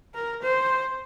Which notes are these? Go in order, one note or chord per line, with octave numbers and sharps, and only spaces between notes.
A#4
C5